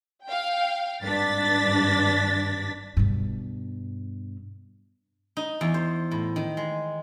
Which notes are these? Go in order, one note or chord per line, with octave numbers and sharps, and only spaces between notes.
F5 G5
G#1 G2 D4 A6 B6
G2 B2
D#4
E2
C5
A2
D#3
G#3